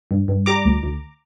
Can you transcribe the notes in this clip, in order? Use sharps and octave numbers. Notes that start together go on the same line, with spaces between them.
G2
G2
G3 A#5 D6
D2
D2